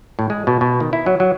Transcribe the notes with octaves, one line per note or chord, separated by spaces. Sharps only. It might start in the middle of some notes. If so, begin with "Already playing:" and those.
A2
G#3
B2
B2
D#3
E4
F#3
F#3